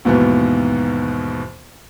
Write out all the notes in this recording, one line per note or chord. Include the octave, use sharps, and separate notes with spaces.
D#2 G#2 B2 E3 B3